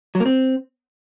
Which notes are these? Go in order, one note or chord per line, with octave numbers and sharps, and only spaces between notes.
F#3
A#3
C4